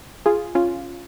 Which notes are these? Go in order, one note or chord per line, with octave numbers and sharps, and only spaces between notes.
F4 G#4
C#4 F4